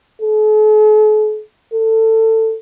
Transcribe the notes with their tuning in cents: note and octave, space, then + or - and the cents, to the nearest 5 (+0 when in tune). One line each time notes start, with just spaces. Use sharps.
A4 -45
A4 +20